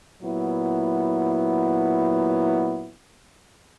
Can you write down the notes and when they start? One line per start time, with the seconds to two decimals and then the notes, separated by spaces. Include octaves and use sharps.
0.21 A#2 F#3 B3 E4